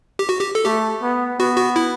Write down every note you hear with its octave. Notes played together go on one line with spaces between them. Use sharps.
G4
F#4
G4
A4
A3 G4
B3
B3 F#4
F#4
E4